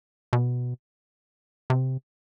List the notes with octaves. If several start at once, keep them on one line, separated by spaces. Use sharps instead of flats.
B2
C3